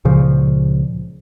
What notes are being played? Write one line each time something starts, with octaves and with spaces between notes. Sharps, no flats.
C#2 A#2 C#3 F3